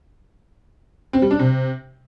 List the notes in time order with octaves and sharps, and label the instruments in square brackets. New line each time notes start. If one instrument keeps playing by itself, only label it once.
[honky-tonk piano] C4
G3
D4
C3